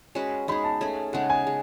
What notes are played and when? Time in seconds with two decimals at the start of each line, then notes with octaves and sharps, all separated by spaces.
0.15 G#3 C#4 F#4 B4
0.48 G#3 D#4 G#4 B5
0.64 A5
0.81 A3 C#4 G#4
1.13 C#3 G#3 D#4 F#5
1.30 G#5
1.47 G#3